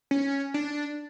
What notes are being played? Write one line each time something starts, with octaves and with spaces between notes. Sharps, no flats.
C#4
D4